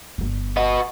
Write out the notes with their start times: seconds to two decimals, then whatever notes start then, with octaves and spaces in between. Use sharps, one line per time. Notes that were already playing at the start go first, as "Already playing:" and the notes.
0.18 G1 D3
0.57 B3 F#4 D#5